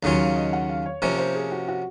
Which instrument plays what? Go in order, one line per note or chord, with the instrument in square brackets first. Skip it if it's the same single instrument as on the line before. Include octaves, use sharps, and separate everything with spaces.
[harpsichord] D#2 C#3 F#3 C#4 F4 [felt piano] F5
[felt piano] F5
D#5
F#5
F5
C#5
[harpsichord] C3 F3 A#3 C#4 [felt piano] C5
[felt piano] C5
G#4
F#4
F#4